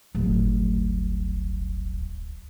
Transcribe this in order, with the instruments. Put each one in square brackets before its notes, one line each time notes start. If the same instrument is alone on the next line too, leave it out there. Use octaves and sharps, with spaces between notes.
[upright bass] D1 G1